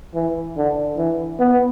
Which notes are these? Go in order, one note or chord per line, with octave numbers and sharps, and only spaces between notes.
E3
D3
E3
B3